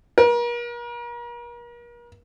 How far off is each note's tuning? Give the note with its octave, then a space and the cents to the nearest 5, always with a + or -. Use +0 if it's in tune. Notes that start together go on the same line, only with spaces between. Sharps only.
A#4 +40